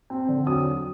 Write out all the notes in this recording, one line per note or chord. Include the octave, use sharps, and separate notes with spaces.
C4
D3
F#3 D#6